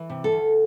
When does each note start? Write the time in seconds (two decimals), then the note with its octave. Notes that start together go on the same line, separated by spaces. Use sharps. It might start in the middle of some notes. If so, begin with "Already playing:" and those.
Already playing: E3
0.10 C3
0.24 A4
0.32 D2